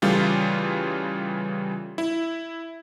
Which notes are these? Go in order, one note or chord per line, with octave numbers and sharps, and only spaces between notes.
C#3 E3 G3 A3 F4
E4